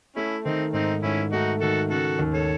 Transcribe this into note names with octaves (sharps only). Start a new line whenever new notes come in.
A3 C#4 E4
D#3 C4 D#4
G#2 C4 D#4
G#2 C#4 E4
A3 D#4 F#4
D#3 F#4 A4
C#3 F#4 A4
D#2
A4 C#5